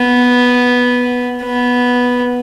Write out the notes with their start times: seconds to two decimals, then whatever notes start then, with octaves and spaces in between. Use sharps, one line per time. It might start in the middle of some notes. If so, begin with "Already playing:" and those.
Already playing: B3
1.43 B3